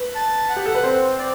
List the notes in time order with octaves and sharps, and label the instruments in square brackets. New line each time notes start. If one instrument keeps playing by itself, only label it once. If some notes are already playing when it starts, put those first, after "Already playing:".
Already playing: [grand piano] B4
[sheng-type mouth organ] A5
F#5
[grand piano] G4
A4
B4
[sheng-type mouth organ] C4 [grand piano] C5
[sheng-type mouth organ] D5